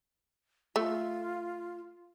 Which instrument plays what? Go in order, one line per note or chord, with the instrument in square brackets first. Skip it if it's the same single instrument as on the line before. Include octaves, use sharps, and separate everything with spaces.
[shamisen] A3 [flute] F4